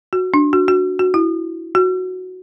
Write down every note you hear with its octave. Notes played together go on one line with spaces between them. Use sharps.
F#4
D4
F#4
F#4
F#4
E4
F#4